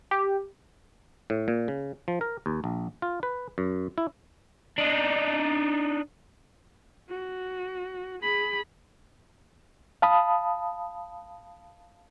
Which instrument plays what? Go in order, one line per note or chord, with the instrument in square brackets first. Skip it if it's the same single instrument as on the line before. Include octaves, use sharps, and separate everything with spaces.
[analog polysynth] G4
[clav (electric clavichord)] A2
A#2
C#3
F3
A#4
D#2
A#1
F4
B4
F#2
E4
[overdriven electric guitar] D4 D#4
[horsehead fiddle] F#4
G#4 B5
[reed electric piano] F5 A5 B5 D#6